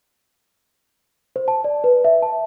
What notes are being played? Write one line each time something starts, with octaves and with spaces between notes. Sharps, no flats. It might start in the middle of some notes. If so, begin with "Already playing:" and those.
C5
A5
D5
B4
E5
A5